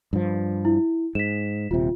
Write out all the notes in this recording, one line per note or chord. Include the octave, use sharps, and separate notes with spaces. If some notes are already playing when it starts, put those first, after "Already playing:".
G2 F3
E4
G#2 B6 E7
D#1 C3 F4